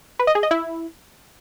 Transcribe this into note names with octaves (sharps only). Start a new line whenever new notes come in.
B4
D#5
G#4
D#5
E4